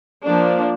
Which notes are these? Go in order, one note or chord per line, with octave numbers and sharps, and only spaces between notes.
F3 A#3 D4